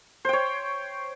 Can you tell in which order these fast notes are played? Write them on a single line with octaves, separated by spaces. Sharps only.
C5 G5 C#5